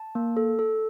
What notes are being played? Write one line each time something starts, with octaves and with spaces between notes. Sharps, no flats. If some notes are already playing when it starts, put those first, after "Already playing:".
Already playing: A5
A#3
A4
A4